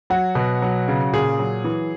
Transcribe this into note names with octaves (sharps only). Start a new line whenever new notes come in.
F#3 F#4
B2
F#3
C#3
A#2 G#4
F#3
E3